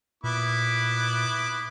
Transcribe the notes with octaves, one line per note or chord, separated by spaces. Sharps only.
A#2 B3 E4 D6